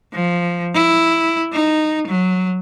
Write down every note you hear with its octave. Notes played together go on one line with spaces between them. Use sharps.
F3
E4
D#4
F#3